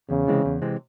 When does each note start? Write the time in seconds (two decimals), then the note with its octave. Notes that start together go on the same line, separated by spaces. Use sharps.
0.09 E2 C#3
0.27 C3 E3 G#3 C4
0.45 E2
0.62 C3 E3 G#3 C4